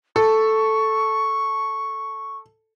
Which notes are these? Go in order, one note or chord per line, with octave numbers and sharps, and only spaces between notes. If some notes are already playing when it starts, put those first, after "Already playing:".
A4 C#6